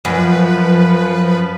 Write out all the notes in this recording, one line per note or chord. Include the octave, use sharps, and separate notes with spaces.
F#2 F3 B4